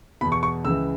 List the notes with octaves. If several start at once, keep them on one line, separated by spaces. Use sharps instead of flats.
E2 B2 B5
C#6
C#6
C#2 C#3 E3 E6